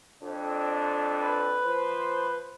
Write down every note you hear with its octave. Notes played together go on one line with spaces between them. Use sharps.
F2 C4 D4
B4
F3 C5